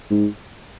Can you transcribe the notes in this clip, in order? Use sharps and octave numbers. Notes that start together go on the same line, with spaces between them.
G#2